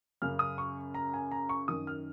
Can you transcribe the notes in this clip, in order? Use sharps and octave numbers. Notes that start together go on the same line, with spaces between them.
F#2 C#3 F6
D#6
C#6
A#5
G#5
A#5
C#6
F#2 D#3 D#6
F6